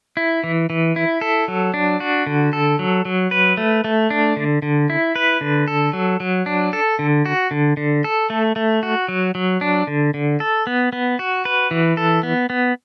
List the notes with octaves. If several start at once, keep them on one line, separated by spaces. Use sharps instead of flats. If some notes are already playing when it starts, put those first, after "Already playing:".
E4
E3
E3
E4
A4
F#3
D4
F#4
D3
A4
F#3
F#3
B4
A3
A3
D4
D3
D3
E4
B4
D3
A4
F#3
F#3
D4
A4
D3
F#4
D3
D3
A4
A3
A3
F#4
F#3
F#3
D4
D3
D3
A4
B3
B3
F#4
B4
E3
A4
B3
B3